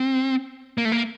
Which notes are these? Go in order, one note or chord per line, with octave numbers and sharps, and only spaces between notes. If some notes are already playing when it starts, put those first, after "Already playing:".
Already playing: C4
A#3
A3
A#3